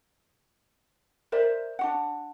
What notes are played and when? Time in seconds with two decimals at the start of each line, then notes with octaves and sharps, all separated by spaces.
1.32 A#4 C5 D5 E5
1.79 D4 F#4 F#5